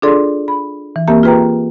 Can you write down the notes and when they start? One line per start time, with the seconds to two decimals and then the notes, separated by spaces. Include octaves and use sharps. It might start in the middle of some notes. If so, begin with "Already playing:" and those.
0.02 D4 F4 G#4 A4 D5 C6
0.48 B5
0.96 E3
1.08 A#3 C4 G4 A#4 E5 A5
1.23 F4 G#4 B4 G5 A#5